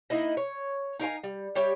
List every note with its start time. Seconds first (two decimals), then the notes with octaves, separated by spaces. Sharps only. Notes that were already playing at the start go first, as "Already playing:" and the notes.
0.10 A#3 D#4 E4 D#5
0.37 C#5
1.00 D#4 A#4 F5 G#5
1.23 G3
1.55 G3 G4 C#5 E5